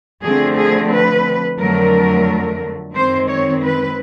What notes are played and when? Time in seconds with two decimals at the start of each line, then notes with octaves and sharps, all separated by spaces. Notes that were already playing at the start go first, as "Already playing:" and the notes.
0.22 D3 F3 A3 C4 G#4
0.56 G#4
0.90 B4
1.58 F2 D3 F#3 A3 A#4
2.94 F#2 D#3 G#3 C4 C5
3.29 C#5
3.62 B4